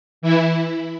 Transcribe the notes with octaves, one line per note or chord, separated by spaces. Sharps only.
E3 E4